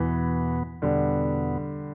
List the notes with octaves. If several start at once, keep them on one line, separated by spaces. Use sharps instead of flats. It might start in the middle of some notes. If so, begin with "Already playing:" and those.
Already playing: E2 B2 E3 B3
E2 B2 D3 G3 B3